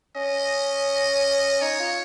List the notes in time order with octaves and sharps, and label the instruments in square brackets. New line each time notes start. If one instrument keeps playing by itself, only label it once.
[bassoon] C#4 [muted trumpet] D#5
[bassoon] D#4 [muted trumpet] C#5
[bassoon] F4